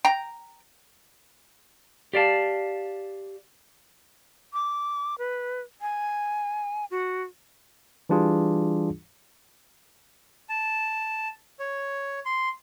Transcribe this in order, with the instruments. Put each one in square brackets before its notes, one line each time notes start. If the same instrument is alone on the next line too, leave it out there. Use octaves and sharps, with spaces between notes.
[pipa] G5 A#5
[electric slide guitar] G4 D5 F5 A5
[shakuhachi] D6
B4
G#5
F#4
[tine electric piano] E3 G3 D4 F4 G#4
[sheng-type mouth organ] A5
C#5
C6